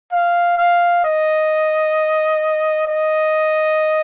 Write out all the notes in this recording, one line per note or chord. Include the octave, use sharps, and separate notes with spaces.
F5
F5
D#5
D#5